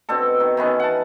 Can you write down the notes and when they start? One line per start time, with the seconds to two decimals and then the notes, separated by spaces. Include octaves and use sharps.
0.09 B2 C4 D4 A4
0.40 D#3
0.57 D#3 E3 B3 C#4
0.80 F#5 A5